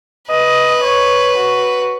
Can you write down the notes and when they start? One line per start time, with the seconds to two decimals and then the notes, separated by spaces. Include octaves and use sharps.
0.30 B4 D#5
0.84 C#5
1.37 F#4